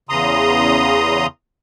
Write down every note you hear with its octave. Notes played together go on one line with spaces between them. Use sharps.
E2 C#3 A#5 C6 D#6